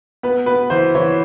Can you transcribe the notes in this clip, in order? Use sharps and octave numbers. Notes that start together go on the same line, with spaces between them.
B3 B4
B3 B4
E3 C5
E3 C#5